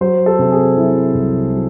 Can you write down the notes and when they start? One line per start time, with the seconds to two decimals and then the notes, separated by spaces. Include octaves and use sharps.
0.01 F#3 C5
0.26 A4
0.39 C3
0.51 G#4
0.77 F#3 E4
1.15 C2
1.53 F#3